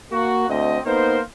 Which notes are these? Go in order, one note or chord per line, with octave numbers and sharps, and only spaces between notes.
A#3 F#4
D2 C4 D#5
A#3 B3 D#4 A#4 C5